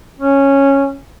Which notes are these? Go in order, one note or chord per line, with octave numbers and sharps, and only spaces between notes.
C#4